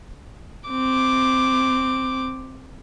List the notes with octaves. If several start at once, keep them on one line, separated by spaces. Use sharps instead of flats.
C4 D6